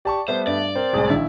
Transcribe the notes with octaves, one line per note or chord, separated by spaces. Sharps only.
G4 D5 A5 C#6
G3 A3 B3 C5
G2 D5
C4 A#4 C5
C2 A2 G#3 G#4
A#1 D#3 E4